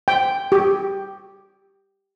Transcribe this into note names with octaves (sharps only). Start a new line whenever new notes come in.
G5
G4